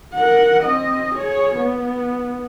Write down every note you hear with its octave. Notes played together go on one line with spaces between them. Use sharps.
A#4 F#5
C4 D#5
G#4 C#5
B3